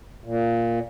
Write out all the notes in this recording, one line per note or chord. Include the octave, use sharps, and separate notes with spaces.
A#2